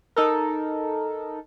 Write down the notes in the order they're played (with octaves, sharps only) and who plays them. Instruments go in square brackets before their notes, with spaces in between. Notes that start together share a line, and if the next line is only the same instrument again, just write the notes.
[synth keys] D#4 A4 A#4